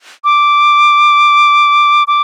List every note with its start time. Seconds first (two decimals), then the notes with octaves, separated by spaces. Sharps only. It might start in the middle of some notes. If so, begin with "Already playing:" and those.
0.24 D6
2.08 D6